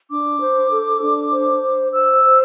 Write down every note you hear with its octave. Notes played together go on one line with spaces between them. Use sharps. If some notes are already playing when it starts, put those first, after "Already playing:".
D4 D6
C5
A4
D4
C5
C5
C5 E6
C5